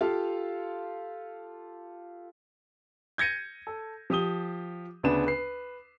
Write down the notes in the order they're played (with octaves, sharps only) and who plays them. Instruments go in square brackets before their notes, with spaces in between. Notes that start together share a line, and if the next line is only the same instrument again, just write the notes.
[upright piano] F4 G4 A4 F5
[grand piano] G6 G#6 A#6 C#7 D#7
A4
F3 G4 D#6 G7
D2 C#3 B3 D4 E7
B4 C7